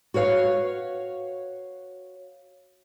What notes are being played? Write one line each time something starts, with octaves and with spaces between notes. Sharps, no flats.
F#4 B4 C#5 F5